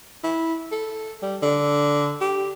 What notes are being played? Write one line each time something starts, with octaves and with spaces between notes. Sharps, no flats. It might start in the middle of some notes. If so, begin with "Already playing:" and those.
E4
A4
G3
D3
G4